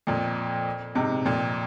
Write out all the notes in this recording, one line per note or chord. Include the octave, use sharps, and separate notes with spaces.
F2 A#2
G#2 C3
F2 A#2